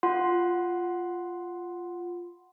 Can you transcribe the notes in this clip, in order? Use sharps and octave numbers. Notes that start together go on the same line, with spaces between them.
F4 F#5 C6